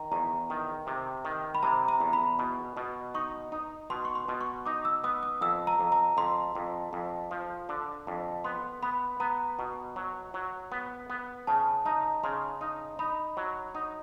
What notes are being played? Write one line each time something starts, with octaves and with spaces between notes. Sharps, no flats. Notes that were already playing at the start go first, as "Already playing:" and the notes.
Already playing: D#3 A#5
E2 A#5
D#3
C3
D#3
B5
C3 A#5
A#5
E2
B5
B2
B2
D#4 C#6
D#4
B2 C6
C#6
C6
B2
C#6
D#4 D6
E6
B3 D#6
D#6
F2 E6
A#5
F2
A#5
F2 C6
F2
F2
F3
D3
F2
B3 C6
B3 B5
B3 A#5
B2
F#3
F#3
B3
B3
C#3 A5
D#4 A#5
C#3 C6
D#4
D#4 B5
F#3
D#4